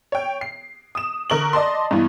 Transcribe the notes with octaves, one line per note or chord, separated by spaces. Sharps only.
C#5 G5
C7
D#6 E7
D3 A#4 C#6 F#7
D5 D#5 A5 C6
G2 E3 B3